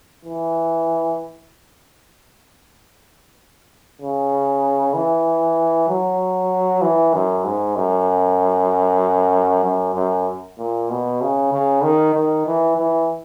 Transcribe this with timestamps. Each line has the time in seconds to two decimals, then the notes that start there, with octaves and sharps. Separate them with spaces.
0.25 E3
4.01 C#3
4.94 E3
5.89 F#3
6.82 E3
7.14 F#2
7.45 G#2
7.76 F#2
9.64 F#2
9.95 F#2
10.59 A#2
10.90 B2
11.21 C#3
11.53 C#3
11.83 D#3
12.14 D#3
12.46 E3
12.77 E3